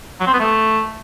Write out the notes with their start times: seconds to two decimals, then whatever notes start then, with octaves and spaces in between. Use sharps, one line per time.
0.20 F#3
0.27 C4
0.33 B3
0.40 A3